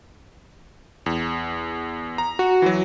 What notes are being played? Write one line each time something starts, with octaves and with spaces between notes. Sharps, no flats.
E2
A#5
F#4
E3 F#3